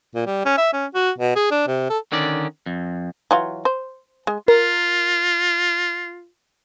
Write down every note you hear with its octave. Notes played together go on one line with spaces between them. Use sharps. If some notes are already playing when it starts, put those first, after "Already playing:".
A#2
G3
C#4
E5
C#4
F#4
B2
G#4
D4
C3
A4
D3 D#3 C#4 D5
F2
E3 F#3 F4
C5
G#3
F4 A#4